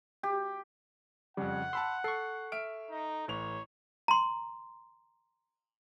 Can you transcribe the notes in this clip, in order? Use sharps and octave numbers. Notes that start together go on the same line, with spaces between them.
G4
F2 C#3 G3 F#5
A5 B5 C6 E6
A4 C#6 C7
E5 F6 D7
D#4
A1 C#5 F7
A#5 C6